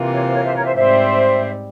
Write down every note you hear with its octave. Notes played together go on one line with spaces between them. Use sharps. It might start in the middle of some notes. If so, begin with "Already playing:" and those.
Already playing: C3 E3 A#3 F4
A#4 C#5
C5
A#4 C#5
C5 E5
A#4 C#5
C5 E5
G#2 G3 C4 C5 E5